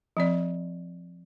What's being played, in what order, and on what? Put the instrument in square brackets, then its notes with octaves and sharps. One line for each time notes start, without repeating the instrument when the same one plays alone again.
[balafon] F3 C4 D5